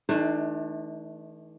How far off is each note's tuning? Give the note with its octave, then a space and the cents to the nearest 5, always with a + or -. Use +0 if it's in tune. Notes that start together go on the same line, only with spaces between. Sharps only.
E3 -45 A3 -30 D4 +30